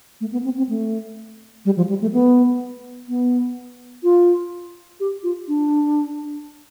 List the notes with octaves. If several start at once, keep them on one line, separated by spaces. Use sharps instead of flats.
A3
B3
C4
C4
A3
G3
F3
G3
A3
B3
B3
F4
G4
F4
D4